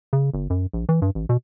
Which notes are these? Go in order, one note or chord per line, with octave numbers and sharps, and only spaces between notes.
C#3
G1
F#2
A#1
E3
G2
A1
B2